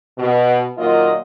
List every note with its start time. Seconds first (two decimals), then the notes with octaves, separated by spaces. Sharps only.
0.18 B2
0.78 A#2 D#3 F#3 A#3 F4 D#5